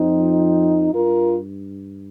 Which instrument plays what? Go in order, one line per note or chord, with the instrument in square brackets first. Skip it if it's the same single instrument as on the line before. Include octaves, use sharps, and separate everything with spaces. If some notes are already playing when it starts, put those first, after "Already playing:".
Already playing: [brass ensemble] F2 F3 C4 D#4
G2 F4 A#4